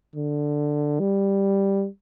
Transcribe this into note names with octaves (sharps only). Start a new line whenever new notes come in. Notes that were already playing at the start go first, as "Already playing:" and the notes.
D3
G3